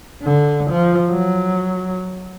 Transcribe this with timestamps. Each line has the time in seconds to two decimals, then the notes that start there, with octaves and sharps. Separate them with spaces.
0.23 D3
0.71 F3
1.10 F#3